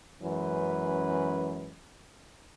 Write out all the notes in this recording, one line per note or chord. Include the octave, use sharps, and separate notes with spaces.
F#2 E3 G#3 C#4 B4